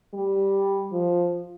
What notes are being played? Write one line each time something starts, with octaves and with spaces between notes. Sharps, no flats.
G3
F3